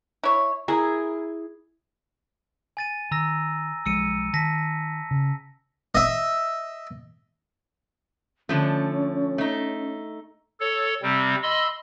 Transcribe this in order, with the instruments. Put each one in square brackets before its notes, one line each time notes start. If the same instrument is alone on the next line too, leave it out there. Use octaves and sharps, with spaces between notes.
[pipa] E4 C#5
[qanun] E4 G#4 [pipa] A#4
[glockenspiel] G#5 A6 D#7
[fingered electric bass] D#3 [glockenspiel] A#5 E6 A#6
[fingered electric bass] B1 F3 G#3 [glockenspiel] E6 C#7 D#7
[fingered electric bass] D#3 [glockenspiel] A5 A#6 B6
[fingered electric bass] C#3
[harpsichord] D#5 E5
[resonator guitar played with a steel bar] D3 F3 A3 [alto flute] C#4
[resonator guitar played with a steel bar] A3 D#4
[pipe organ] A4 C#5
C3 G3 C4
D#5 B5 C6 E6